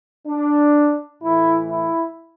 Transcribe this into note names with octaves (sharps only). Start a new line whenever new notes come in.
D4
A2 E3 A3 E4
E4